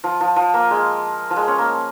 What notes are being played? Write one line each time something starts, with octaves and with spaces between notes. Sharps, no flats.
F3
F3
F3
A#3
G#3
F3
G#3
C#4
A#3